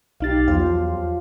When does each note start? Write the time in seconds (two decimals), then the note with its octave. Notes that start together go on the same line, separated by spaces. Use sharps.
0.20 B1 D#4 G4 F5 A6
0.48 E2 F3 F#3 C5 F5